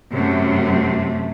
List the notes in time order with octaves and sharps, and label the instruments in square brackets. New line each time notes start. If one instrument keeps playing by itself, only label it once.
[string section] F#2 [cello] C3 A3